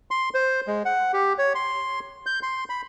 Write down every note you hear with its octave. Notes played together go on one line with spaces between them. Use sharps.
C6
C5
G#3
F#5
G4
C#5
C6
G6
C6
B5